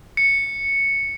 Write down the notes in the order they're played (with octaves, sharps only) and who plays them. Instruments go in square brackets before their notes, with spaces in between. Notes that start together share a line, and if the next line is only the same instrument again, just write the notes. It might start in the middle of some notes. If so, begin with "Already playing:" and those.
[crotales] C#7